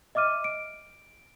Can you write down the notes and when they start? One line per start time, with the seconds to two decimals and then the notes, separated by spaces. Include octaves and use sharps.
0.15 D#5 E5 D6 F6 D#7
0.44 D7